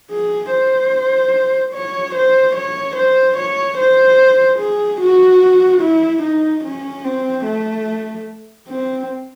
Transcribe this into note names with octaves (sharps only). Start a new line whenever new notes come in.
G#4
C5
C#5
C5
C#5
C5
C#5
C5
G#4
F#4
E4
D#4
C#4
C4
A3
C4